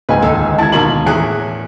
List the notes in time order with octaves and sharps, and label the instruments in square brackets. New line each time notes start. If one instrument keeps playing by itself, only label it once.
[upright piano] C#2 G#2 G#5 [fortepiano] B4
[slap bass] D#2 D3 [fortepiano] A4
[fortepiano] E4 [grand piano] A5 G#6
[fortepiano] G#2 B2 A#3 [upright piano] F#7
[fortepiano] E2 G#4 F#6 [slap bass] A2